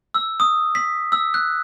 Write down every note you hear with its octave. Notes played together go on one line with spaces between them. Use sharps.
E6
D#6
B6
E6
F#6